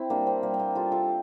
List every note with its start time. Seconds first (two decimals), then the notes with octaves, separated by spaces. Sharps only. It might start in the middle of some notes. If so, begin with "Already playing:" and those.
Already playing: C4 E4
0.10 G3 A#3 D4
0.27 C4
0.43 G3 A#3
0.54 C4
0.59 A#3
0.75 G3 F4 A4
0.92 F4 A4